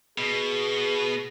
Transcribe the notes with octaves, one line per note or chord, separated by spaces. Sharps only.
B2 G#4